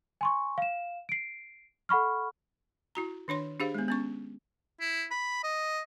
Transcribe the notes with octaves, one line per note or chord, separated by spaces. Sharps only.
G#5 C6 C#6
F5 E7
C7 D7
A4 F#5 B5 C#6 F6
E4 F#4 A#5
D#3 D4 C#5 C6
D4 G4 G#4 C5 F5
G#3 B3
B3 C#4 C#6
E4
B5
D#5